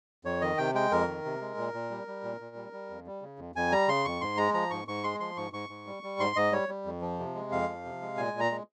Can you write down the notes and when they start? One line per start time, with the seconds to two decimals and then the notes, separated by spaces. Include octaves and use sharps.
0.25 F2 C#5
0.41 D#3 D#5
0.58 C3 G5
0.75 G#3 G5
0.92 F2 A#4
1.08 D#3
1.25 C3
1.41 G#3
1.57 A#2
1.74 A#2
1.90 G3
2.07 G3
2.23 A#2
2.40 A#2
2.56 G3
2.73 G3
2.90 F2
3.06 G3
3.22 C#3
3.39 F2
3.55 F2 G#5
3.71 G3 A#5
3.88 C#3 C6
4.05 F2 C#6
4.21 G#2 C6
4.37 G#3 A#5
4.54 F3 A#5
4.71 G#2 C#6
4.88 G#2 C#6
5.04 G#3 C6
5.20 F3 C6
5.37 G#2 C#6
5.53 G#2 C#6
5.69 G#2
5.87 G3
6.03 G3
6.19 G#2 C6
6.36 G#2 D#5
6.52 G3 C#5
6.69 G3
6.85 F2
7.01 F3
7.19 C3
7.35 G#3
7.52 F2 F5
7.68 F3
7.85 C3
8.02 G#3
8.17 A#2 G#5
8.33 A#2
8.40 A#5
8.51 G#3